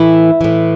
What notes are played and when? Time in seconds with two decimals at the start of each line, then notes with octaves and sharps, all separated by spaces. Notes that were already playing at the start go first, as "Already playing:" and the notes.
Already playing: A2 E3 E4
0.41 A2 E3